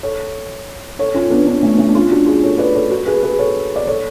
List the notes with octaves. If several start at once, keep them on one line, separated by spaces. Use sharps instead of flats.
A4 C#5
A4 C#5
C#4 F4
B3 D4
B3 D4
A3 C#4
A3 C#4
D4
C#4 F4
D4 F#4
F4 G#4
A4 C#5
B4 D5
A4 C#5
F#4 A4
G#4 B4
G#4 B4
A4 C#5
D5
A4 C#5